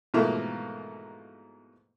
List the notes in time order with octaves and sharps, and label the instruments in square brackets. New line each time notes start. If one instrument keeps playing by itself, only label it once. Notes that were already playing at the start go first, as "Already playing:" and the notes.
[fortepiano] G#2 B2 E3 F3 A3 A#3